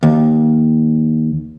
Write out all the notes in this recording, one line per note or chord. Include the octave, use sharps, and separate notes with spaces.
D#2